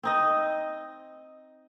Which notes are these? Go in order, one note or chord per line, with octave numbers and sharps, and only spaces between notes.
C4 D#4 D#5